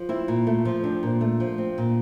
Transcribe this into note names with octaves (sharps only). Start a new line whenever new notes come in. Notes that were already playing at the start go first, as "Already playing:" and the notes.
Already playing: F3
C4 E4
A#2
A3
F3
C4 D4
A#2
A3
F3
C4
A#2